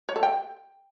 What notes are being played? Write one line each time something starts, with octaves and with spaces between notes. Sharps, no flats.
C#5
A4
G5